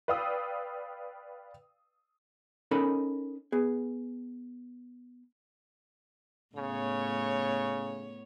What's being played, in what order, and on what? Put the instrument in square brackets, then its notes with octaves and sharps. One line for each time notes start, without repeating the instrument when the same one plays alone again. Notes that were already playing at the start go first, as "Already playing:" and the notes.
[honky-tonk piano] B4 D5 F5 G5 D#6 E6
[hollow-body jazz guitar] C#4 D#4 A4 A#4 D#5 B5
B3 G#4
[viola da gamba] A2 B3 C#5 [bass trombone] C#3